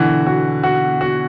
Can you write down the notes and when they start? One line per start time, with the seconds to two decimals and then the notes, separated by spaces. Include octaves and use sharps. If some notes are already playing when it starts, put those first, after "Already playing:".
Already playing: B2 D3 E3 F#4
0.26 F#4
0.63 F#4
1.01 F#4